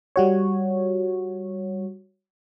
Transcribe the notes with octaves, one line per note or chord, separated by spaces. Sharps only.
G3 F#4 C#5